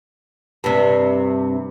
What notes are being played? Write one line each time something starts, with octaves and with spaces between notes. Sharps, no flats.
G2 C3